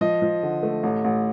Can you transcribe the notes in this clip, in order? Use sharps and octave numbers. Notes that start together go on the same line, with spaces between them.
F3 D#5
F3
D3
A3
A1
A1